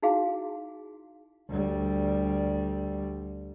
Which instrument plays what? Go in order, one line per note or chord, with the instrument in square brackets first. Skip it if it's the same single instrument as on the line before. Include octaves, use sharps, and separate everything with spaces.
[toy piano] D#4 E4 F#4 G#4 F5
[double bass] D2 G3